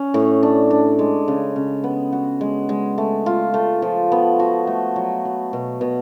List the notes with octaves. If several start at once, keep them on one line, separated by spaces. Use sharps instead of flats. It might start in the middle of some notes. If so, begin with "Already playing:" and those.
Already playing: C#4
A2
D4
D4
G#3
C#3
C#3
B3
F#4
G#3
G#3
A3
F4
A3
F3
B3
F#4
A3
F#3
F#3
B2
B2